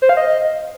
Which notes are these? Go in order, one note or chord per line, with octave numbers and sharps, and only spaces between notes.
C5
F5
D#5